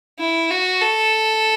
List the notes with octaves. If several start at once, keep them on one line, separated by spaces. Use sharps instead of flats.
E4
F#4
A4